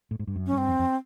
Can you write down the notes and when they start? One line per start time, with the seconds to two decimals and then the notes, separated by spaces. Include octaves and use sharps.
0.11 A2
0.19 G#2
0.27 G2
0.36 F#2
0.47 C#4
0.52 G2
0.58 C4
0.68 F2
0.79 F2